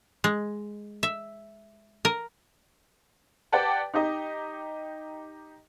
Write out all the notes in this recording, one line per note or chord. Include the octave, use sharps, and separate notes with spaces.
G#3
E5
A#4
G4 B4 D5 F#5 G5 A5
D#4 G4 D#5